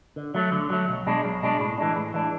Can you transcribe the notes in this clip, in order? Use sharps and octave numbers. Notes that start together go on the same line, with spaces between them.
D3
F#3 A3
D3
F#3 A3
B1
B2 G#3 D4
B1
B2 G#3 D4
A2
E3 G#3 D4
A2
E3 G#3 D4